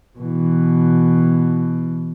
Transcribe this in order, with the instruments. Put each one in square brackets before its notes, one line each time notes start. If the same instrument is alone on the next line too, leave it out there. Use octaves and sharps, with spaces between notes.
[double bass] B2 E3